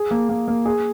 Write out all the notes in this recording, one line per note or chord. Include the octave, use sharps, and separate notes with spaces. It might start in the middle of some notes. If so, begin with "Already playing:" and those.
Already playing: G#4
A#3
A#3
A#3
G#4